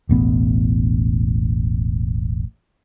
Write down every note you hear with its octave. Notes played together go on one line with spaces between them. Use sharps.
E1 A1 B3